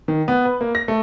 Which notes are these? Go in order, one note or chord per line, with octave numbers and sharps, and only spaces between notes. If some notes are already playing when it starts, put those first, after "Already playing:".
D#3
B3
B4
A#3
A#6
A3